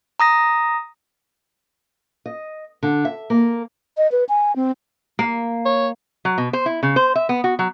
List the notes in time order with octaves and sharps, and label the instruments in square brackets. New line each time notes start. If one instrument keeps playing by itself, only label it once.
[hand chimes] A#5 D#6 A#6
[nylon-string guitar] D#5
D3
E5
A#3
[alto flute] D#5
B4
G#5
C4
[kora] A#3
[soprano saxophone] C#5
[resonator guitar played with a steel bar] F#3
B2
C5
E4
C#3
C5
E5
B3
F#4
F#3